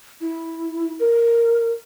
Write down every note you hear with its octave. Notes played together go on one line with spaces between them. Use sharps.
E4
A#4